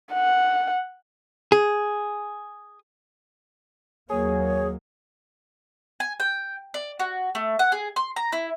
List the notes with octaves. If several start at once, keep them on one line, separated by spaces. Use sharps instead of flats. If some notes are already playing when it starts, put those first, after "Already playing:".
F#5
G#4
D#2 F#3 A#3 G#4 C#5
G#5
G5
D5
F#4
A3
F#5
G#4
C6
A#5
E4